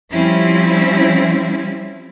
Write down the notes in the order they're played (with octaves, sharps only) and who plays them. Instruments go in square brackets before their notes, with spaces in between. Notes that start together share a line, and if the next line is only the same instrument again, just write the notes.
[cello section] F3 G3 C4 C#4 E4